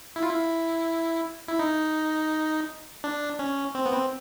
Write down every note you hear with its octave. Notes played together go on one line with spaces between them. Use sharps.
E4
F4
E4
E4
D#4
D4
C#4
C4
B3
C4